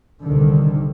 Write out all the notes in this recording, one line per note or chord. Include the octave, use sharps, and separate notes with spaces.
C2 D3 D#3